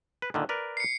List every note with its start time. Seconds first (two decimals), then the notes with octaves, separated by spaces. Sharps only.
0.22 B4
0.34 A#2 D3 D#3
0.49 A#4 B4 D5
0.77 C7 C#7